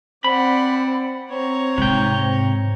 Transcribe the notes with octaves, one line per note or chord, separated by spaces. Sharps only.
C4 D5 F#5 B5
C4 C#5 A#5
G#2 C3 G5